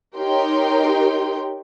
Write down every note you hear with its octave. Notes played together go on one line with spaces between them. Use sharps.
D#4 G4 A#4 C#5 G5 C6